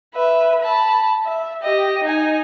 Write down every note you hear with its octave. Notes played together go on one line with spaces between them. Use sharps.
B4 E5
A5 B5
E5
G4 D#5
D#4 G#5